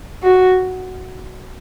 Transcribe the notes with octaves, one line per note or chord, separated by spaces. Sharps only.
F#4